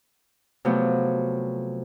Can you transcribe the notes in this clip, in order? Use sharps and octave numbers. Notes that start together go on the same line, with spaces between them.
C3 F3 F#3 A3 B3 C4